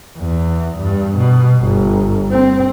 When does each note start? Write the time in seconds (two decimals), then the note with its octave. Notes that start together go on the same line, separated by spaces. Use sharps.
0.18 E2
0.79 G2
1.18 B2
1.65 G1
2.31 C4